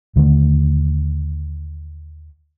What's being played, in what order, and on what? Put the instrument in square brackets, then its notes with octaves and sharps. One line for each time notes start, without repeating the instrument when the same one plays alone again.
[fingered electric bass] D#2 D3 G3 A3